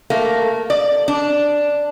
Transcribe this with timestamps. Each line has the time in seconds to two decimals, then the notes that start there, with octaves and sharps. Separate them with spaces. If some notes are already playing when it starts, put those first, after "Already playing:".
0.10 A3 A#3
0.70 D5
1.08 D4